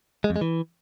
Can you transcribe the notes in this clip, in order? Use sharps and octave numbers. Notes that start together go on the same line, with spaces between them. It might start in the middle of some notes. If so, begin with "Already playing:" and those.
G#3
F2
G#3
E3